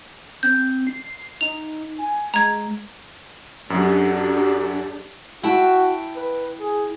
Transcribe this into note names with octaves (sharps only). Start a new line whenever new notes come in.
C4 G6
C7
D#4 F7
G#5
G#3 A#5 G#6
F#2 F#3 D4 G4 A4
E4 F#4 G5 A5
B4
G#4